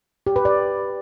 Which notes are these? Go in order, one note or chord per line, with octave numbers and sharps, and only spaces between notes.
G4
B4
D5